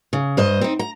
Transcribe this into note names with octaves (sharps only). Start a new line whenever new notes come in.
C#3
G2 C5 D#5
C4 D#4
A#5